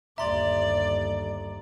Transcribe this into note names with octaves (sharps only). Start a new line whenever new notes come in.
G1 D#2 D5 E5 A#5 C6 A6